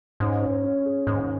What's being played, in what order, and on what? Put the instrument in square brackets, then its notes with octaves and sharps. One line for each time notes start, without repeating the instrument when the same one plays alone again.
[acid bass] G#2 [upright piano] C#4
[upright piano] C#4
C#4
G#4
[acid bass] G#2 [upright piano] D#3